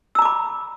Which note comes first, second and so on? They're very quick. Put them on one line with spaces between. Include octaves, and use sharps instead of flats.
E6 A#5 D6 B5